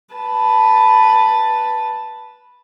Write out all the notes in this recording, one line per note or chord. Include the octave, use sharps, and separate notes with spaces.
B4 A5